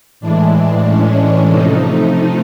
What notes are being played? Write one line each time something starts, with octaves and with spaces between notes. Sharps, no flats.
A2 E3 G#3 D4
C#4
C3 F3 A3 D#4